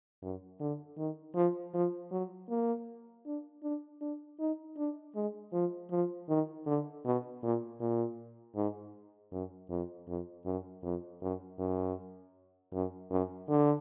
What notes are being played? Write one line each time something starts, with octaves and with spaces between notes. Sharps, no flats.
F#2
D3
D#3
F3
F3
F#3
A#3
D4
D4
D4
D#4
D4
G#3
F3
F3
D#3
D3
B2
A#2
A#2
G#2
F#2
F2
F2
F#2
F2
F#2
F#2
F#2
F#2
D3